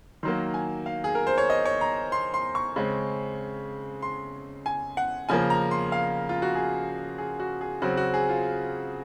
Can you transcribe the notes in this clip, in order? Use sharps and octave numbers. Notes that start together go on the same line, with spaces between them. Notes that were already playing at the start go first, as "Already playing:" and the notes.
D#3 F#3 A#3 C6
G#5
F5
G#4
A#4
C5
C#5
D#5
C#5
A#5
C6
C6
C#6
C#3 G#3 C4
C6
G#5
F#5
C#3 F3 A#3 G#5
A#5
C6
F5
F4
F#4
G#4
G#4
F#4
G#4
C#3 F#3 C4 F#4
F#4
G#4
F4